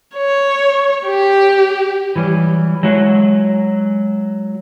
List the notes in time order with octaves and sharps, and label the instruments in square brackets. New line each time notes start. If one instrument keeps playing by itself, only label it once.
[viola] C#5
G4
[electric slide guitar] E3 F#3 G3
F#3 G#3 E4 F#4